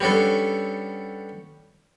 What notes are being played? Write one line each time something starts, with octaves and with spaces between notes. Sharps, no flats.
G3 B3 C#4 D4 A4